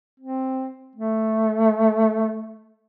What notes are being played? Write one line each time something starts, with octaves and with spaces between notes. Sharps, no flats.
C4
A3